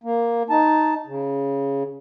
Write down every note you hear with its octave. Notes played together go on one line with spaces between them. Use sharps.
A#3
D#4 A5
C#3